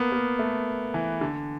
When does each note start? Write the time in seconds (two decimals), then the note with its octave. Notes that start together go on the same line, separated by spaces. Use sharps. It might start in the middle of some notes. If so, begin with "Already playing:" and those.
Already playing: A#3 B3
0.12 A#3
0.39 A3
0.94 E3
1.21 D3